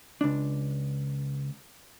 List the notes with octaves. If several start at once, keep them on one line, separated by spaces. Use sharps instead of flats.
C#2 D4